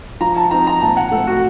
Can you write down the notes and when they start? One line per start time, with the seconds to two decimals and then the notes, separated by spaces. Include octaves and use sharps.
0.21 F3 A#5
0.36 A5
0.51 C4 D#4 A#5
0.67 A#5
0.81 A#2 A5
0.97 F#5
1.12 A3 A4
1.17 C4
1.27 F#4